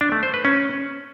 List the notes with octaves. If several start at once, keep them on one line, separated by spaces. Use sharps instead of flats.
D4
A3
C5
B4
C#4